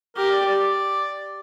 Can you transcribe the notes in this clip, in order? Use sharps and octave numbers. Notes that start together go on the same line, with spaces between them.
G4 A#4
D5
D5